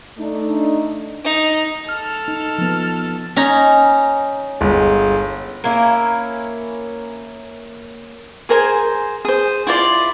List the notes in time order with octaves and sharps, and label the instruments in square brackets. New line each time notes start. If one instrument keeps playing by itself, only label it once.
[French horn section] A3 D4 D#4
[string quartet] D#4
[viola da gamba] A4 [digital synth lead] F6
[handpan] D#4
F3 B3
[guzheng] C#4 D#4 A#5
[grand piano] G1 G#3
[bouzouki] A#3 C#4 E4 A#4
[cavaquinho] G#4 A#4 C5 G#5
G#4 C5
E4 F4 D5 C6